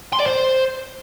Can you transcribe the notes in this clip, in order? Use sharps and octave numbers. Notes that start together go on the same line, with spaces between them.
C6
D5
C5